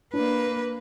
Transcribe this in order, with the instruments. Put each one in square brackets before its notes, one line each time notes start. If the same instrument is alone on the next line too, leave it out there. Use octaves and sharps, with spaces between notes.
[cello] A#3 B4 [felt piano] D4